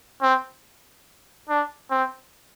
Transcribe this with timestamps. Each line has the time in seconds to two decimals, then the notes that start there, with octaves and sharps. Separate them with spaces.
0.22 C4
1.49 D4
1.91 C4